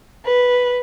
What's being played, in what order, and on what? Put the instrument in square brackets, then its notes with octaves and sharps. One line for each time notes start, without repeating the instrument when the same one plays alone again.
[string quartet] B4